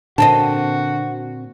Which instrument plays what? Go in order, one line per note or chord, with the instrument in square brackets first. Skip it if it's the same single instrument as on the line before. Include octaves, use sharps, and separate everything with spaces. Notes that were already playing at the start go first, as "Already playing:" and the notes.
[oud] A#2 C4 D#5 [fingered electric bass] D3 [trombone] F#4 [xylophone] A5